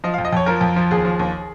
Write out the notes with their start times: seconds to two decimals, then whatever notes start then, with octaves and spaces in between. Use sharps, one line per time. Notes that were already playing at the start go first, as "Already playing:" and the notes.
0.04 F3 D#5
0.14 F5
0.18 F2
0.25 D#5
0.33 F2 C#5
0.46 F3 A#4
0.61 F2
0.76 F3
0.91 D#2 G#4
1.05 F3
1.19 D#2